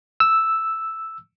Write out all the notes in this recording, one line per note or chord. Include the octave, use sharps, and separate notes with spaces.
E6